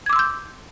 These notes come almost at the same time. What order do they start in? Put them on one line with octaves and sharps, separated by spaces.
G#6 D6 E6 C6 G6